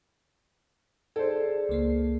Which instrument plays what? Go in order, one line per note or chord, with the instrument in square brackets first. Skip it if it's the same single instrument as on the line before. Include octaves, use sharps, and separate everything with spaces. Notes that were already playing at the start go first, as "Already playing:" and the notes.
[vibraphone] G#4 D5 [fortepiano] A4 C5
[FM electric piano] C#2 A#3 C7